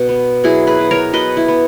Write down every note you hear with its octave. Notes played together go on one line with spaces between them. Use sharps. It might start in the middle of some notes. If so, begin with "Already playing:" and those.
Already playing: B2
B3
F#3 E4 G#4
G#4 B4
B2
A#4 C#5
B2 B4 D#5
E4
B3